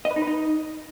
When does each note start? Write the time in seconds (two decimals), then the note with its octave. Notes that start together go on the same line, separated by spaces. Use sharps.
0.05 D#5
0.11 B4
0.16 D#4
0.22 B4
0.27 D#4